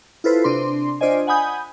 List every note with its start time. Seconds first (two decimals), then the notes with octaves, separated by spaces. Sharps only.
0.24 E4 F4 A4 B4 C5
0.44 C3 D4 C6
1.01 D4 F4 C5 D5 D#5 G#5
1.27 F#5 G#5 B5 D#6 G6